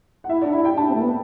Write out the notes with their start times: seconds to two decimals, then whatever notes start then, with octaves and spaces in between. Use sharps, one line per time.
0.24 F#5
0.29 E4 E5
0.42 D4 D5
0.53 E4 E5
0.65 G5
0.77 D4 A5
0.89 C4
0.94 A3
1.01 B3